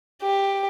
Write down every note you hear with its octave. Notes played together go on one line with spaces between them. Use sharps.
G4